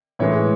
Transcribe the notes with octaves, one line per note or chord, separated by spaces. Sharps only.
A2 E3 G#3 C#5